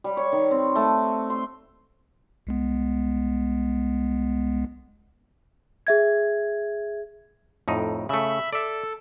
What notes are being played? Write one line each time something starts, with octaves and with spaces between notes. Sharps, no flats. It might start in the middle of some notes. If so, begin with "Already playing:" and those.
G3
C#5
D#3
C4
A3
C6
C2 G#3 B3
G#4 E5 G#6
F2 A2 D#4
C#3 A3 E5 B5
A4 D5 E5